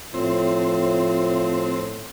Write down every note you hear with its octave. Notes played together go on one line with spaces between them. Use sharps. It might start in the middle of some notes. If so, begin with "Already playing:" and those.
A2 F3 C4